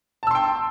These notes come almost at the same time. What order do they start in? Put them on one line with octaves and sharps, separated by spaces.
A5 E6 C6 G5